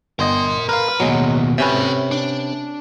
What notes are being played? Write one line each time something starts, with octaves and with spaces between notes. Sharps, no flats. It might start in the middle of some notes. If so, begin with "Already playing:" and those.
G1 A#4 D#5 C6
A#4 B4 F5
D#2 B2 F#3 G#3
C3 C#4 B4 C#5 E5
D4